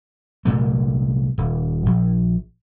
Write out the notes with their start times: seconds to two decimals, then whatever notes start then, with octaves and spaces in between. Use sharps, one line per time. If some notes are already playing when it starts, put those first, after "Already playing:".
0.45 C2 A#2 A3
1.38 D#1
1.86 A#1